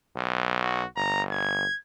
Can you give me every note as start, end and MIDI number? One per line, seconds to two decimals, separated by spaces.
0.16 0.82 35
0.63 0.86 66
0.96 1.65 31
0.96 1.22 82
1.32 1.78 92